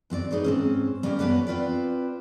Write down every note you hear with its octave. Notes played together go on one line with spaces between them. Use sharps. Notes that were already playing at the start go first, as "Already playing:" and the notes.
F#2 C4 F#4 D5
D#4 G#4 B4 C#5
G#2 C4 C#4
G3 A#3 B3 C#4 F#4 G4
F#2 A#2 B3 B4 C#5 D5
C4 F4 B4 D5